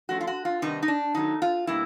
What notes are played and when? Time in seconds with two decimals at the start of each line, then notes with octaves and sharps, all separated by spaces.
0.09 F3 A3 C#4 F#4
0.21 F4
0.27 F#4
0.45 F4
0.62 C3 D#3 G3 B3 D4 D#4
0.83 D#4
0.88 D4
1.15 D#3 F#3 A3 D#4
1.42 F4
1.67 B2 G3 A#3 E4